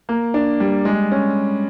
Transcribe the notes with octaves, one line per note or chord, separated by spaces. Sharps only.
A#3
D4
G3
G#3
C#4